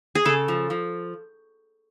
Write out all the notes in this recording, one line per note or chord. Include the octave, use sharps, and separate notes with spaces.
G#4
C#3 A4
F3
F3